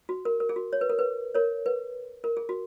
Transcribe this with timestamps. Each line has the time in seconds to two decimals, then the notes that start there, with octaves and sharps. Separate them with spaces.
0.09 F#4
0.25 A#4
0.40 A#4
0.49 G#4
0.56 F#4
0.73 C#5
0.81 B4
0.90 A#4
0.99 B4
1.35 A#4 C#5
1.66 B4
2.24 A#4
2.37 G#4
2.49 F#4